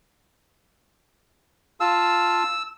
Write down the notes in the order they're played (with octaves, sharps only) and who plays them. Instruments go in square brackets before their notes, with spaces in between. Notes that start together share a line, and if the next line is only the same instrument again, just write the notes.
[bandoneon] F4 F5 A5 [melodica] E6